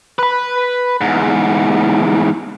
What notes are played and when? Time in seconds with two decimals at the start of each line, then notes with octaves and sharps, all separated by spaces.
0.19 B4 B5
1.01 E2 G#2